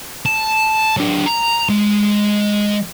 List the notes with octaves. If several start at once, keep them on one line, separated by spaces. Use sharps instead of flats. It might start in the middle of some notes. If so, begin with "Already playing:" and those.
A5
F#3 D4
A#5
G#3